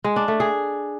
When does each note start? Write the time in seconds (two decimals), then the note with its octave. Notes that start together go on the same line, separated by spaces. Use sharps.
0.04 G#3
0.16 D4
0.28 A3
0.40 G#4